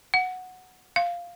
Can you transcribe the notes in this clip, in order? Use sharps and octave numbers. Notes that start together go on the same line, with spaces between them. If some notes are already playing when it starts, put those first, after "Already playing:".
F#5
F5